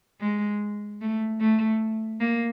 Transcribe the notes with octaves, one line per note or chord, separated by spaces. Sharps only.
G#3
A3
A3
A#3